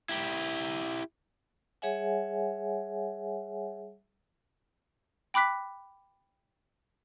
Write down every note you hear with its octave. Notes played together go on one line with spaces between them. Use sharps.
E4 G4
G3 G#4 C#5 E5 F#5 G#5
G5 B5 D6 F#6 B6